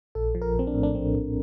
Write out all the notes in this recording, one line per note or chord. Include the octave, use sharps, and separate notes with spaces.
A#1 A4
F3
A#4
A#1 C4
D4
A2
D4
A#1 C4
A#1